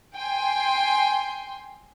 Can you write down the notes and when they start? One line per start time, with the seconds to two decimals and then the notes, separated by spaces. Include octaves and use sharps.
0.16 G5 G#5 C6